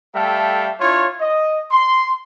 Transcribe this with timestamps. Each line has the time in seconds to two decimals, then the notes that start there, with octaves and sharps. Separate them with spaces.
0.15 G3 A3 A4 E5 F5 G5
0.81 D4 E4 F4 C#5
1.21 D#5
1.71 C6